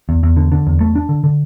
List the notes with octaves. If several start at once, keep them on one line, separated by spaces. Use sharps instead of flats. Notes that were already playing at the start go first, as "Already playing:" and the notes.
E2
E2
D3
D3
E2
A3
D4
D3
D3